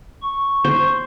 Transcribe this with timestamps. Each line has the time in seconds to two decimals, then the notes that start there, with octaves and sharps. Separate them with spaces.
0.22 C#6
0.65 C5